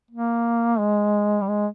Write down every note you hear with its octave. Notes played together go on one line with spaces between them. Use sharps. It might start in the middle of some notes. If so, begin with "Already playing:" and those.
A#3
G#3
G3
G#3